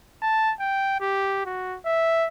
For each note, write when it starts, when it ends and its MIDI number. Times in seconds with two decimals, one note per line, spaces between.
0.22 0.52 81
0.60 0.99 79
1.00 1.45 67
1.45 1.78 66
1.85 2.28 76